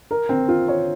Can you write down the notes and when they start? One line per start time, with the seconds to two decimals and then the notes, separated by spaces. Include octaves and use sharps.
0.11 A#4
0.29 C4
0.48 F4
0.68 C#5